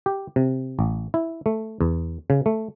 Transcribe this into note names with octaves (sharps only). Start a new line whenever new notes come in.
G4
C3
A1
E4
A3
E2
C#3
A3